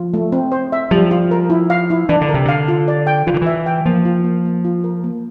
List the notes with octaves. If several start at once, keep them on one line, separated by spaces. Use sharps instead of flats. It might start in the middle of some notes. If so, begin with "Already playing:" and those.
Already playing: F3 F4
A3
C4
C5
E5
F3 G3
F4
A#4
E4
F5
E4
E3 D4
D3
A#4
C3
D3 F5
F4
D5
G5
E3 F4
D3
E3 E5
G5
F3 A#3
F4
A#3
A#3
F4
A#4
A#3